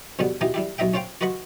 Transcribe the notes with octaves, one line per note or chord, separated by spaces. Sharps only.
F2 B2 D3 G3 B3
B2 E3 D#4 G4 D#5
G3 E4 G4
B1 D#4 D#5 E5 G5
C#4 F4 C5 F5 G5
F4 F#4 B4 D#5 B5 C#6